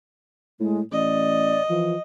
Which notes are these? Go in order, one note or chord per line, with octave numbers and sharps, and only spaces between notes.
A2 G#3
A1 D5 D#5
E3 F3